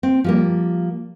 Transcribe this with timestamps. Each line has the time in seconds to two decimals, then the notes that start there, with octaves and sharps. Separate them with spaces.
0.03 C4
0.24 F3 G3 A#3